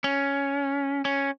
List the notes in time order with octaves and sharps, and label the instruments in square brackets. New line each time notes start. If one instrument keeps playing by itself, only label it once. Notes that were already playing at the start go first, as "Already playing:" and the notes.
[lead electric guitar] C#4
C#4